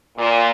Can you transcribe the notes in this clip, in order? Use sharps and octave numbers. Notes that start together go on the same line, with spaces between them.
A#2